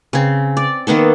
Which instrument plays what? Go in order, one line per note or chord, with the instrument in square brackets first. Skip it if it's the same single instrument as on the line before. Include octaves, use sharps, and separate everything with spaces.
[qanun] C#3 C4
D5
D#3 A#3 B3 A4